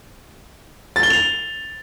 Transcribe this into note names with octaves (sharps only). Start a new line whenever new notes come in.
A6
G7
F7